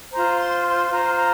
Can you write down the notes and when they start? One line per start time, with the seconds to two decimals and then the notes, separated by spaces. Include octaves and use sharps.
0.12 F4 C5 A#5
0.38 C6
0.65 C6
0.86 C6
0.91 F4 C5 A#5
1.17 A#5